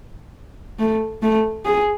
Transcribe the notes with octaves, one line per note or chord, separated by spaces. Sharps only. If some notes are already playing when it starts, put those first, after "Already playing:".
A3
A3
G#4